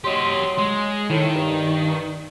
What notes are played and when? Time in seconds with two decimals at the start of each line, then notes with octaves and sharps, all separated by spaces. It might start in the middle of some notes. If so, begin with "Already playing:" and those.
0.04 F#3 G4 D#5 C6
0.58 G#3
1.10 A2 D#3
1.35 G2